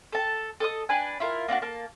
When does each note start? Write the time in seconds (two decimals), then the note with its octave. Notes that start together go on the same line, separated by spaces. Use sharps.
0.12 A4 A5
0.60 A4 D#5 D#6
0.89 D4 B4 G#5
1.20 E4 F4 A#4
1.48 A#3 D4 E4 F#4
1.62 A#3 A5